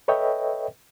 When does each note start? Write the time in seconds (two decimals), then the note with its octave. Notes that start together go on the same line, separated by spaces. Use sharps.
0.08 A4 B4 C#5 D#5 E5 G5